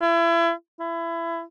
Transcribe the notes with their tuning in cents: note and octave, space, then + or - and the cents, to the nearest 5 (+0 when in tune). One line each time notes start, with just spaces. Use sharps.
E4 +35
E4 +25